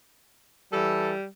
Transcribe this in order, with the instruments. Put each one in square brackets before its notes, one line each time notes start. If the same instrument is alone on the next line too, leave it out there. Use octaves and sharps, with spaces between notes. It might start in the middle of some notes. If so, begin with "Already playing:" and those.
[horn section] E3 A4 [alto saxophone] G3